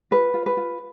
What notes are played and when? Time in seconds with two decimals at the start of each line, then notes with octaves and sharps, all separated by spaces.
0.11 F4 B4
0.34 F4
0.46 B4
0.57 F4